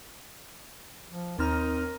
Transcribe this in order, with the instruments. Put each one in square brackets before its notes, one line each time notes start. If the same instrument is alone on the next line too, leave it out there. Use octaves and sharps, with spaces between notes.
[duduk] F3
[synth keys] D#2 C4 F6 [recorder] D#4 [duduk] A#4